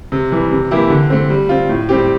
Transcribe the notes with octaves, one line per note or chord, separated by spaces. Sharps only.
C3
E3 G3
C3
E3 A#3 E4 G4
D3
A3 C4
G3
C4 F4
A2
G3 C4 G4